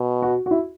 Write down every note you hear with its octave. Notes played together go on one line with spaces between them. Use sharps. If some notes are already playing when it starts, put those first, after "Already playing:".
Already playing: B2
F#4
F#4
E4